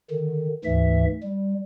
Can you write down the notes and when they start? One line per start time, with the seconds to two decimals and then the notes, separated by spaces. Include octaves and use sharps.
0.11 D3 D#3
0.65 D2 G#2 E3 E5
1.23 G3